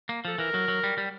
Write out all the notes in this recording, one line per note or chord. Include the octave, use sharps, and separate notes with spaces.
A#3
F3 A4
E3 A#4
F#3
F#3
G3
G3